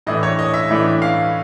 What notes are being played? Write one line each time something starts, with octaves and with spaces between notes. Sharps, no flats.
A2 E3 A3 D4 D#5
C#5
D#5
E5
A2 E3 A3 D4
F5